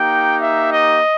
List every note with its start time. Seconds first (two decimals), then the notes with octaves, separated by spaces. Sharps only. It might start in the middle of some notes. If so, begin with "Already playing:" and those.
Already playing: A#3 D#4 G4 G5
0.41 E5
0.70 D#5